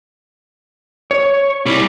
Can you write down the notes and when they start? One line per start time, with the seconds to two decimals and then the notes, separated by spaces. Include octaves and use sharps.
1.11 C#5
1.66 C2 G3